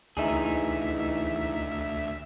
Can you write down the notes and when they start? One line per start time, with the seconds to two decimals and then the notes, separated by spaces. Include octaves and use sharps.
0.17 D2 E3 D#4 G#4 E5